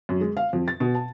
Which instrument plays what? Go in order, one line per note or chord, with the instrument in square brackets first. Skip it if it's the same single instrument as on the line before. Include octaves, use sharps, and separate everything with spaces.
[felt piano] F#2
G#3
F5
F2
A6
B2
A5